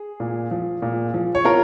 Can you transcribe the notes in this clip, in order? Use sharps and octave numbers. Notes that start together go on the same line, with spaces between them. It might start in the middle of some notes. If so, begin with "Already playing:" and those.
Already playing: G#4
A#2
F3
A#2
F3
C#5
F4 A#4